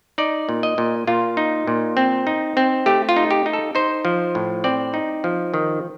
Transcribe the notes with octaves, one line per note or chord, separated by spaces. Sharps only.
D#4 D5
A#2
D#5
A#2
A#2 F4
D#4
A#2
C4
D#4
C4
A3 G4
F4
D#4
G4
D#4
A4
D#4 C5
F3
A2
C4 D5
D#4
F3
D#3